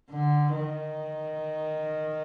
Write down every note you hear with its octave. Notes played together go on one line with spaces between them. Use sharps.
D3
D#3